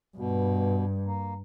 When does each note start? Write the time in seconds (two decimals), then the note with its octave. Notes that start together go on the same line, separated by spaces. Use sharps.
0.17 G2 B2
1.06 A#3